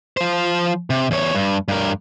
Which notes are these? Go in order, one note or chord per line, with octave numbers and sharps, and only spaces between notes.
F3 C5
C3
E2 C#5
G2
G2 A#4